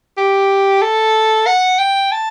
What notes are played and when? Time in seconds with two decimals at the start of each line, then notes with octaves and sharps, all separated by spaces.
0.17 G4
0.82 A4
1.47 F#5
1.78 G5
2.12 A5